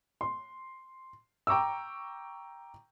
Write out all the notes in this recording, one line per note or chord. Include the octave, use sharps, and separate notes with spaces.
C6
G5 A#5 C#6 D6 E6